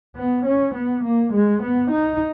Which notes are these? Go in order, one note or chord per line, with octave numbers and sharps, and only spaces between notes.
B3
C#4
B3
A#3
G#3
B3
D#4